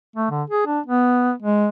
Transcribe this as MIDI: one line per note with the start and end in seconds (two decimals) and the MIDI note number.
0.16 0.29 57
0.31 0.43 50
0.50 0.64 68
0.67 0.80 62
0.86 1.32 59
1.42 1.69 56